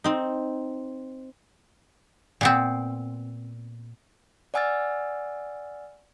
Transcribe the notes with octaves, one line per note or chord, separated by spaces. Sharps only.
C4 D#4
A#2 B3 C4
D5 F#5 G#5 E6 F6 A6